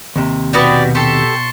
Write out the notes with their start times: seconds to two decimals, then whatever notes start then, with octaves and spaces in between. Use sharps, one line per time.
0.16 D#2 C3
0.53 B2 B3 F#4 G4 D5
0.95 G4 A4 A5 C6 C#6